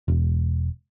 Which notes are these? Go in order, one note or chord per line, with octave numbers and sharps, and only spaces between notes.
E1